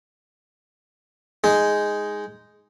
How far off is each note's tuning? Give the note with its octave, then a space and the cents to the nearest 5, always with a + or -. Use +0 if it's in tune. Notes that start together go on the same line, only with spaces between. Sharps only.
G#3 +0 D#4 +0 G#4 +0